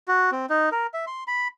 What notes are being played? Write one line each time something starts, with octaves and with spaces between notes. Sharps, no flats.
F#4
C4
D#4
A#4
E5
C6
B5